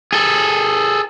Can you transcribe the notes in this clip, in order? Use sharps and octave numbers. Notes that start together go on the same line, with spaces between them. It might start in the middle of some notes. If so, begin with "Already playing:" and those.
G#4 A4